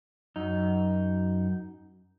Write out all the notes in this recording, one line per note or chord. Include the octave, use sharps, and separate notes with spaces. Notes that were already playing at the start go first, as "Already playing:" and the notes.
F#2 D#4